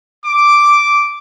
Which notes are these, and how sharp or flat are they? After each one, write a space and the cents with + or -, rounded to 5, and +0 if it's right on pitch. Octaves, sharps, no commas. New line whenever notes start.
D6 -5